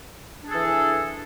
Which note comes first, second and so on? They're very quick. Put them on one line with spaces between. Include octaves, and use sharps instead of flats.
D4 G#4 A4 E3